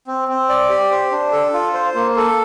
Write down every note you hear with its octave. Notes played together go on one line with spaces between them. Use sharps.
C4
C4
D5
G4
C5
D4
A4
F4
C5
A#3
A4